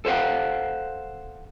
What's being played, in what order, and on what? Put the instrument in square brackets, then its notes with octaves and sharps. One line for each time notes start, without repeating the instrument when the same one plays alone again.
[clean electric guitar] A4 C5 C#5 F5 F#5